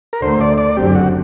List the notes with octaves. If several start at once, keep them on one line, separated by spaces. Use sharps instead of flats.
A#4
D2 D3 A3 C5
D5
D5
F#1 F#2 D3 F#3 C4 G4
F#4